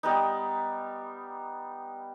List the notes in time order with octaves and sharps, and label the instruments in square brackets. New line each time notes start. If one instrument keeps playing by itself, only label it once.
[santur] G3 B3 D#4